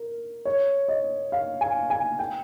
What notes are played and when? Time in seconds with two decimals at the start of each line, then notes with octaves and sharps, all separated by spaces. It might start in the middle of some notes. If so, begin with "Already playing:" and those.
Already playing: A#4
0.45 C#5
0.88 D#5
1.32 F5
1.61 G#5
1.90 G#5
2.19 G5